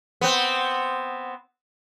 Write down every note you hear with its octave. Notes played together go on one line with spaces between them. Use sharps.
B3 C4